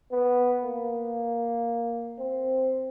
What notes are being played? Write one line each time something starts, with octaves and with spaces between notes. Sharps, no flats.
B3
A#3
C4